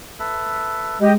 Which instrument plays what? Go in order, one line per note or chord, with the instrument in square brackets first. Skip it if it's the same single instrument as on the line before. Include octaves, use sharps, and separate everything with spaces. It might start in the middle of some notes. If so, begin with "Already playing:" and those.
[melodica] A4 B4 E5
[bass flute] G#3 [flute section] G4 D#5 [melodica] B4